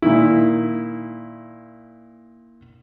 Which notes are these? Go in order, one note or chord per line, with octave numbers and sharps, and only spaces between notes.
A#2 D#3 E4